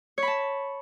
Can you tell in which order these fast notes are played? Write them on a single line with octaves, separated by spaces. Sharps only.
C#5 B5 A5